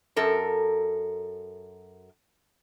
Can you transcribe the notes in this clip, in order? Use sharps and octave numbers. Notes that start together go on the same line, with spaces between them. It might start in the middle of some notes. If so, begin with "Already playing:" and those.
F#2 A4 A#4